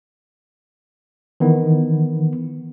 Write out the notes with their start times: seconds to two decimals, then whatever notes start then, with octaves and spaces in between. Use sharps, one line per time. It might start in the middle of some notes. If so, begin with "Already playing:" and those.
1.40 D#3 E3 B3